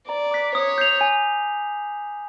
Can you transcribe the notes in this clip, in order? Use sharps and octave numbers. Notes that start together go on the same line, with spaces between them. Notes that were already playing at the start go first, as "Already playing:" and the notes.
D5 A#5
D6 F#6 B6
C#5 D#6
G6 C7 F7
G#5